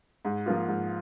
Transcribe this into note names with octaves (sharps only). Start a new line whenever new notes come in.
G#2
F3 A#3 F4
G#2